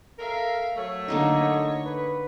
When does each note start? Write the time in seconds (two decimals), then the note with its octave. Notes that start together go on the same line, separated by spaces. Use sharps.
0.19 A4 A#4 E5 F5
0.77 F#3 A3 C#5
1.08 D3 A#3 D#4 D#5
1.85 B4